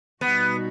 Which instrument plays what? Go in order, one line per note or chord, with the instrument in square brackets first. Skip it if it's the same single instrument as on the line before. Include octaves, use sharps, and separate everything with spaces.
[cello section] B2 G3 D#4 F#4 [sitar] B3